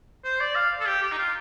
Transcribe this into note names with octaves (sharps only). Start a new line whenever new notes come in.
C5
D5
F5
A4
G4
G4
D#4
F4